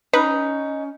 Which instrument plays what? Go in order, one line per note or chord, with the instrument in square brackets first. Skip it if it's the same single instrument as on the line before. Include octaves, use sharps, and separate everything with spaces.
[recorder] C#4 [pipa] D#4 [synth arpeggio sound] B4